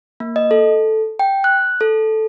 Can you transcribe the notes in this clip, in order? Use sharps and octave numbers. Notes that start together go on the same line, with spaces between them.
A#3
D#5
A4
G5
F#6
A4